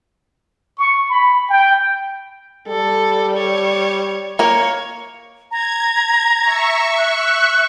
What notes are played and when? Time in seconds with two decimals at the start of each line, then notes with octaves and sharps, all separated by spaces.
0.77 C#6
1.09 B5
1.50 G5
2.68 G3 A4
3.37 C#5
4.39 A#3 A#4 C#5
5.51 A#5 G#6
6.43 E5 C#6
6.98 F#6